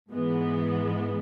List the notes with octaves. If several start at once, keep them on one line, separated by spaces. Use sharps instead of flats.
G#2 E3 G#3 B3